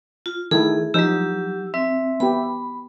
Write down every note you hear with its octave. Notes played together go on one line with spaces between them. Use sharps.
F4
D#3 A3 E4 G#4 A4
F3 F#3 D#4 G4 E6
C4 E5
B3 G4 B5